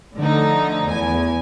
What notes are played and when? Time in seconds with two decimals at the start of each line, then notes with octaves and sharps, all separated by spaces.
0.17 D3 F3 A3 D#4
0.87 E2 G#5